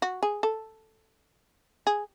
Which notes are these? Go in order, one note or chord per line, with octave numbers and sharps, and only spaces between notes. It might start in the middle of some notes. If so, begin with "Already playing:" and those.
F#4
G#4
A4
G#4